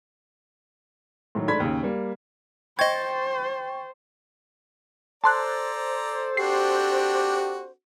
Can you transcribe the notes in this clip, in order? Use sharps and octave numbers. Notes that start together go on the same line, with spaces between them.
A2 D#3 F#3
G#2 A3 D4 B5 G#6 B6
D#2 C#3
G3 A#3
C5 D#5 G5 C#6 G#6 A6
A4 C5 D5 A5 A#5 C6 F#6
C4 D4 F#4 G4 C7